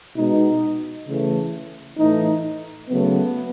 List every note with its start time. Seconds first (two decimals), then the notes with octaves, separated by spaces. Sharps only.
0.16 B2 G#3 B3 D#4
1.07 C#3 E3 A3
1.98 A2 E3 A3 D#4
2.90 C#3 F#3 A3 B3